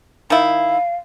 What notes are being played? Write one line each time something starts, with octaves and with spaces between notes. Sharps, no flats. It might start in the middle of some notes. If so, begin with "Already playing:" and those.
D#3 E4 F5